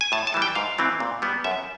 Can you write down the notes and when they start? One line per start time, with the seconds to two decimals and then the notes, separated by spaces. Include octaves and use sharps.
0.01 G#5
0.12 A2 A5
0.27 A5
0.34 E3 G3
0.42 G5
0.55 G#2 F5
0.78 E3 A3 C4
1.00 A#2
1.22 G3 B3
1.44 F#2 E5